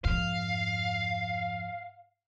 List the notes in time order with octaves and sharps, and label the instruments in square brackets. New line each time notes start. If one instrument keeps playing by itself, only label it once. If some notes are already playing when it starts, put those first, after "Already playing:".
[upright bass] F2 G#2 [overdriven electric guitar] F5